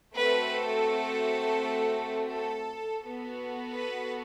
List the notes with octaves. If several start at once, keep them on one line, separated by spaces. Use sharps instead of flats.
A3 C4 F#4 A4 B4
A4
A4
B3 F#4 A4
B4